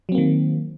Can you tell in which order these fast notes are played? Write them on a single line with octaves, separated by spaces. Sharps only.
F#3 C4 A#3 D#3